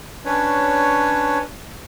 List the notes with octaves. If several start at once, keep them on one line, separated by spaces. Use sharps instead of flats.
C#4 D4 B4 C#5